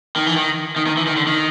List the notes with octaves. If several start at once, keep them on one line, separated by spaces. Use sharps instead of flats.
D#3
E3
D#3
D#3
D#3
E3
D#3
D3
D#3